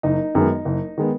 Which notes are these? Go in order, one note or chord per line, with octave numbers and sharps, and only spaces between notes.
F#1 D#4
F#2 D#3 G#3 B3
F#1
D#3 G#3 B3